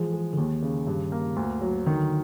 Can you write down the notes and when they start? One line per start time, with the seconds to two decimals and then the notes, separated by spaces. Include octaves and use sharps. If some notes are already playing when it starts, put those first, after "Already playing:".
Already playing: E3 F3 G#3
0.12 G#3
0.33 D3
0.37 D#2 D#3
0.62 C#3
0.87 G2
1.12 A#3
1.36 D2
1.61 F#3
1.87 D3 D#3